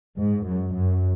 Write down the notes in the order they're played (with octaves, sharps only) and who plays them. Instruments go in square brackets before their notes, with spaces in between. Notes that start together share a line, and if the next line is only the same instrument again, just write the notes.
[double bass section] G#2
F#2
F#2